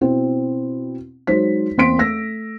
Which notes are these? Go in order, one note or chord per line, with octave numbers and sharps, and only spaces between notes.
B2 C4 E4
F#3 G#3 D#4 C5 B6
E2 A#3 C4 C6 B6 D7
A3 E6 A#6